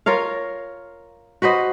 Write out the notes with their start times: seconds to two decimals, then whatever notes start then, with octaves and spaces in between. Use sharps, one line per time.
0.06 F4 A#4 C#5 F5
1.42 F#4 B4 C5 D#5